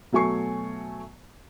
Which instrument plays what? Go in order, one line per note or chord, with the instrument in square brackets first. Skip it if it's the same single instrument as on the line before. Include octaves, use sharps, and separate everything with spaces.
[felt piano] B2 F#3 A3 G#5 C#6 C7